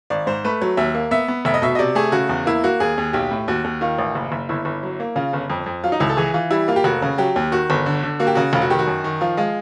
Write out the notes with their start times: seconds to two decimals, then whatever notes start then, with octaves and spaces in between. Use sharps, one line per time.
0.10 G#1 D5
0.27 G#2 C5
0.44 A3 B4
0.62 F#3
0.77 D#2 E5
0.95 A#3
1.11 B3 E5
1.28 B3
1.45 F1 E5
1.54 D#5
1.62 B2 E5
1.75 D#5
1.79 C3 D5
1.95 A3 G#4
2.12 C#3 F#4
2.29 E2
2.46 A#3 E4
2.64 A#3 F#4
2.80 D#2 G#4
2.98 D#2
3.13 B1 G4
3.31 A2
3.48 D#2 F#4
3.64 D#2
3.81 D#3 F4
3.98 A1
4.15 F#1
4.32 F#1
4.49 G1 E4
4.65 G1
4.83 F#3
5.00 A#3
5.16 C#3 F4
5.33 G1
5.50 F2
5.66 F2
5.84 F#3 F4
5.92 D#4
6.00 C#2 E4
6.09 A4
6.17 E3 G#4
6.34 E3 F4
6.51 G3 E4
6.68 A#3 F4
6.76 G4
6.84 F1 F#4
7.02 C#3
7.18 F#3 G4
7.36 D#2
7.52 D#3 F#4
7.70 G1
7.86 D3
8.03 D3
8.20 A#3 F#4
8.27 G4
8.35 C#3 F#4
8.53 F1 F4
8.62 F#4
8.70 D#3 G4
8.79 F#4
8.87 F#2
9.04 D#3
9.21 F3 F4
9.37 G#3 F4